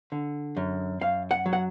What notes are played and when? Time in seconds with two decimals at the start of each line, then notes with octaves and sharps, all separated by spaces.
0.12 D3
0.57 F#2
1.01 F#2 F5
1.31 F#5
1.46 F#3
1.53 F#5